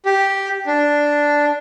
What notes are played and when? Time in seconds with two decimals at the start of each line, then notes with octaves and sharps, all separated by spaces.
0.05 G4
0.66 D4